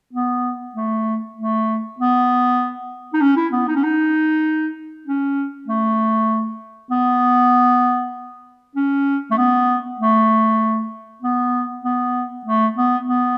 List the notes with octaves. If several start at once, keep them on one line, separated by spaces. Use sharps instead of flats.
B3
A3
A3
B3
D#4
C#4
E4
B3
D#4
C#4
D#4
C#4
A3
B3
C#4
A3
B3
A3
B3
B3
A3
B3
B3